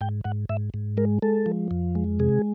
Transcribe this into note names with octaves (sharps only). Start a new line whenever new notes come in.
G#2 G5
G#2 F#5
G#2 E5
G#2
G#3 A#4
G#3 A4
F3
F2
G#3
C3 G#4